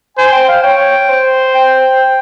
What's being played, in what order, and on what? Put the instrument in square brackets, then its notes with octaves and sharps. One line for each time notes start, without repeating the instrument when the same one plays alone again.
[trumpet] C5 [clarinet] G#5
[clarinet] G5
F5
[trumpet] C#5 [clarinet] G5
[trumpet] C5
[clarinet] G5